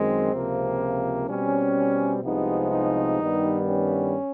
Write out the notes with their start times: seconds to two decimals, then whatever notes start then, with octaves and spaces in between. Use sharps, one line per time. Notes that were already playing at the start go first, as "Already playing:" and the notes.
Already playing: F#2 D#3 G#3 C4
0.31 C#2 C3 F3 A#3
1.27 B2 G3 C4 C#4
2.23 C2 C3 F3 G#3 B3 D#4
2.71 D#4
3.19 G2 D#3 G3 B3
3.67 C#4